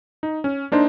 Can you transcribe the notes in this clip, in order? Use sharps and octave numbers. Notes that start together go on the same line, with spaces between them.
D#4
C#4
A#3 D4 D#4 C5